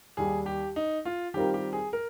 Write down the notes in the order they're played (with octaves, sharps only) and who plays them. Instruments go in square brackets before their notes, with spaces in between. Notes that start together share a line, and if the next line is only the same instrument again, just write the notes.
[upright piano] D#2 D#3 G3 [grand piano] G#4
[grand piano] G4
D#4
F4
[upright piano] D#3 G3 C4 F4 A#4 [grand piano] G4
[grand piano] G4
G#4
A#4